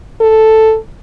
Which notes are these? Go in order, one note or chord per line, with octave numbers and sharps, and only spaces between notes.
A4